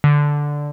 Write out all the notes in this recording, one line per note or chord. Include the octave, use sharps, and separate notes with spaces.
D3